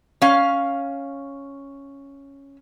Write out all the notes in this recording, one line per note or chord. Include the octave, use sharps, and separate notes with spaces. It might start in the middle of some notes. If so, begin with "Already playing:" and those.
C#4 F5